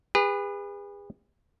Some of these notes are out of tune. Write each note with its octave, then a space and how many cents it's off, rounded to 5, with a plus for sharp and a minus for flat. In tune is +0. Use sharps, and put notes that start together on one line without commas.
G#4 -40 B4 -5